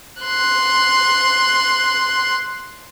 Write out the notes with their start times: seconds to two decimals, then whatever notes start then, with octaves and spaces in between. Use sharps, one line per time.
0.22 C6 F#6